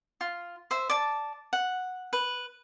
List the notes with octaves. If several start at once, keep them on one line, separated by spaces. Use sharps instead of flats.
F4
C5 E5
D5 A5
F#5
B4